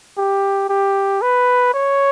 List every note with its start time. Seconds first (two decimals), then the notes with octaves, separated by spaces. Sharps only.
0.17 G4
0.70 G4
1.22 B4
1.74 C#5